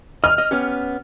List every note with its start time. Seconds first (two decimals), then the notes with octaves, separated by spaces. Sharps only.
0.24 D#5 F6
0.38 D#5
0.51 B3 C#4 G4